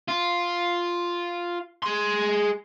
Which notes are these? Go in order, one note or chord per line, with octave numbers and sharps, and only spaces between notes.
F4
G#4 C6